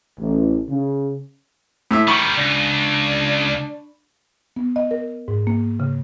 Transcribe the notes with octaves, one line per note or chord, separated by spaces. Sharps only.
A1
C#3
A2 E4 E5
D#3 G3 B5 C#6
C#2 D4
B3
D#5
A#4
G#2
A#3
C#3